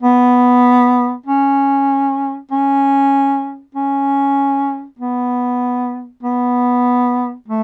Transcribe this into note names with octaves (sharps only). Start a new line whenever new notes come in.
B3
C#4
C#4
C#4
B3
B3
A3